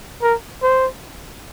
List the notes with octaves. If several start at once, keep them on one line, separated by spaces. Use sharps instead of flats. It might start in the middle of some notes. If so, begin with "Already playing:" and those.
A#4
C5